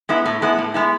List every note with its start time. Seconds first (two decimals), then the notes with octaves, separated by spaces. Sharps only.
0.09 G#3 B3 E4
0.25 A2
0.42 G#3 B3 E4
0.58 A2
0.74 G#3 B3 E4